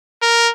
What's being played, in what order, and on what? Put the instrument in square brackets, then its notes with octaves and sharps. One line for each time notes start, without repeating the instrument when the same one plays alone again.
[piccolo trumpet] A#4